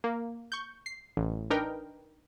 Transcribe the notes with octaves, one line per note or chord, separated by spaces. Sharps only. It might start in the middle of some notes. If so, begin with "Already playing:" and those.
A#3
C#6 G6
C7
A1
D4 D#4 A#4 B4 G5